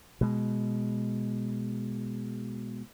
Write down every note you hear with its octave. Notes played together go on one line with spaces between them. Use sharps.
B2 G#3